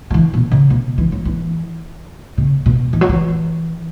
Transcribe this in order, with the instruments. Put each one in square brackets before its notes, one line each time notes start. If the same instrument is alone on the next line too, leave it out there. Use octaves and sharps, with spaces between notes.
[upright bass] F#3
E3
B2
C#3
B2
E3
F#3
E3
C#3
B2
E3
F#3
E3